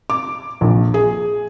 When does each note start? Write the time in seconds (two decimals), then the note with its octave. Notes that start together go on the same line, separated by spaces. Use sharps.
0.10 D6
0.61 A#1
0.94 G#4